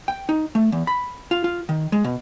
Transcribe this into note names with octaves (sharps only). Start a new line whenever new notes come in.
G5
D#4
A3
E2
B5
F4
F4
D#3
G#3
B2